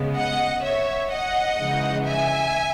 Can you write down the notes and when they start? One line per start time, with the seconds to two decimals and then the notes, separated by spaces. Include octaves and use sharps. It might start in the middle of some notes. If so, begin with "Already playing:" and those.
Already playing: C#3 G#3 B3
0.16 D#5 F#5
0.63 C#5 E5
1.11 D#5 F#5
1.58 C#3 E3 G#3 D#4
2.06 E5 G#5